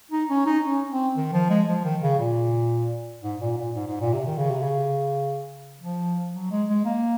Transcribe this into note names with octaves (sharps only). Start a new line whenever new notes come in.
D#4
C#4
D#4
C#4
C4
D#3
F3
G#3
F3
D#3
C#3
A#2
G#2
A#2
A#2
G#2
G#2
A#2
C3
D#3
C#3
C3
C#3
F3
F#3
G#3
G#3
A#3